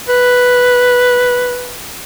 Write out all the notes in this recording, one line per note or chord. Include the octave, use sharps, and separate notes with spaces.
B4